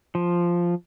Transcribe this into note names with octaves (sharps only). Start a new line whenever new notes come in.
F3